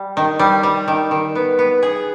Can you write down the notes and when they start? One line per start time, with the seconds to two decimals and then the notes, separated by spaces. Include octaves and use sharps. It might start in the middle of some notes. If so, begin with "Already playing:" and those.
Already playing: G3
0.17 D#3
0.39 G3
0.63 G3
0.88 D#3
1.11 D#3
1.35 B3
1.59 B3
1.83 G#4